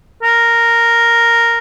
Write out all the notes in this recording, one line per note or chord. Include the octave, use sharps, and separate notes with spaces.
A#4